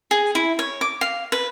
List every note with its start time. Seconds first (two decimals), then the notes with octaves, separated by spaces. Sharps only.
0.11 G#4
0.35 E4
0.59 C#5
0.81 D6
1.01 F5
1.32 B4